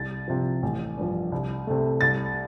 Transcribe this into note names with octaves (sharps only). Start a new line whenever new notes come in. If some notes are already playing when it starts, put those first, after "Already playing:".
Already playing: C2 A6
C3 F3
A1
G2 F3
C2
C3 A3
C2 A6